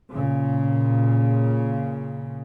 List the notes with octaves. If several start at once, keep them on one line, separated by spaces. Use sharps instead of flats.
A#2 C#3